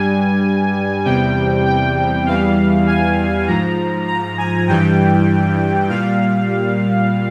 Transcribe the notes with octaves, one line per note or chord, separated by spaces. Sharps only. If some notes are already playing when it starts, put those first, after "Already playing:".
Already playing: G2 G3 G#5
E2 C3 G3 G5
G5
E2 E3 G3 F5
G#5
G#2 F3 A#5
A#5
G#5
G2 E3 G3 G5
A#2 G3 F5